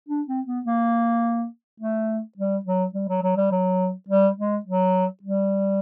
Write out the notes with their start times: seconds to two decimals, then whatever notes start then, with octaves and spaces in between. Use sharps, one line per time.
0.09 D4
0.28 C4
0.47 B3
0.66 A#3
1.81 A3
2.38 G3
2.65 F#3
2.94 G3
3.09 F#3
3.23 F#3
3.37 G3
3.51 F#3
4.09 G3
4.38 G#3
4.66 F#3
5.23 G3